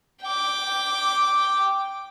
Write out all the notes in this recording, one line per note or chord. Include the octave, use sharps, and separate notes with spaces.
G5 D6